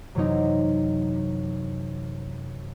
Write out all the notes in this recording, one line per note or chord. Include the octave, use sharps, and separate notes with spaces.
F#2 C3 E3 F#3 C4 D#4